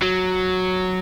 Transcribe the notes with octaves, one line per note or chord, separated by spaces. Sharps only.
F#3